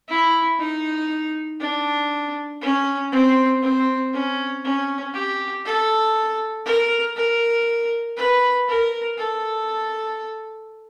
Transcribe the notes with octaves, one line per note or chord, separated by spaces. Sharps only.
E4
D#4
D4
C#4
C4
C4
C#4
C#4
G4
A4
A#4
A#4
B4
A#4
A4